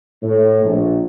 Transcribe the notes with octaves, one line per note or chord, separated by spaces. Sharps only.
A2
A#1